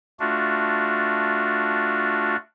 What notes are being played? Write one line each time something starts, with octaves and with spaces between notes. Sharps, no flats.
A3 D4 F4 F#4